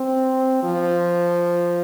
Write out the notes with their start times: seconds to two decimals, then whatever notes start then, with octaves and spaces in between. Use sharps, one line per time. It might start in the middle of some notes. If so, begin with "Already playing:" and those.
Already playing: C4
0.63 F3